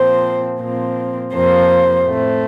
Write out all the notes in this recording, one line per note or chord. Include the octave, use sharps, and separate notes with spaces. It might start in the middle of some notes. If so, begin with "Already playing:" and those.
Already playing: A#2 F3 C4 C5
A#2 F3 C4
F2 C3 F3 A#3 C5
A2 A3 C4